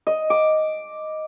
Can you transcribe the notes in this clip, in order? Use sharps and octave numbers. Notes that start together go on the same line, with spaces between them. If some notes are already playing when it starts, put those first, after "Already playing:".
D#5
D6